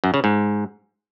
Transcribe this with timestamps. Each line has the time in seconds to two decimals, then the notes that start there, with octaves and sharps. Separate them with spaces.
0.04 F#2
0.14 C#3
0.24 G#2